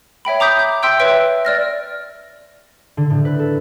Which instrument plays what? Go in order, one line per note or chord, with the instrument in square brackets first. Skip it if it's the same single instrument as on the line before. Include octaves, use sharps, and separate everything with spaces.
[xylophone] C#5 E5 G5 B5
A#5 D6 D#6 G6 B6
G6
E5 G5 C6 E6 G6 D7
B4 C#5 E5 G5 E6 D7
D5 F6 A#6
[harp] D3
A2
B4
A4